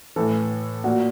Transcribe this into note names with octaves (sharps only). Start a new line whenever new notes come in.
A2 E3 A4
A#2 F#4